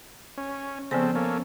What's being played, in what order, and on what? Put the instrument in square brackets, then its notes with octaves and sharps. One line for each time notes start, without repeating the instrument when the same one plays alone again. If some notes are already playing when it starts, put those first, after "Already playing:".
[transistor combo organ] C#4
[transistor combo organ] C#3 C4 A4 [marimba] F3 B3 C5
[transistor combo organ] A#3 C#4 A4